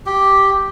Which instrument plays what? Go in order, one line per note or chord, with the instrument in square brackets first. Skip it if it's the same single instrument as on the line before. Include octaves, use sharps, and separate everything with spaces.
[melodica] G4